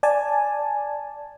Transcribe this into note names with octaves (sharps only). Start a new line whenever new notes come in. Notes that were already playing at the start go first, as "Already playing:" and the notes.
D5 G#5 A5